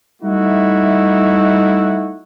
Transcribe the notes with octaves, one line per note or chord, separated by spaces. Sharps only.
G3 A3 D#4 E4 F#4